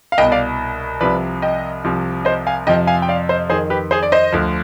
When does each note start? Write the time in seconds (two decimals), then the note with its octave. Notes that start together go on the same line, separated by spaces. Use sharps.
0.12 F5
0.18 C2 B2 D#5 G5
0.32 D5 F5
1.00 C2 C3 F3 B4 D5
1.42 D#5 G5
1.84 C2 C3 F3
2.25 C5 D#5
2.47 F5 G#5
2.67 F2 C3 F3 D#5 G5
2.87 F5 G#5
3.02 G5
3.08 D5 F5
3.29 C5 D#5
3.50 F2 D#3 G#4 C5
3.70 G4 B4
3.91 G#4 C5
4.03 D5
4.12 C5 D#5
4.32 D2 D3 F3